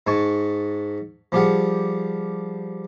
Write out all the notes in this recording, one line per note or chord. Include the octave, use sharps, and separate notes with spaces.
G#2 G#3 G#5 A5 C#6
F3 G3 G4 G#4 F5 F#5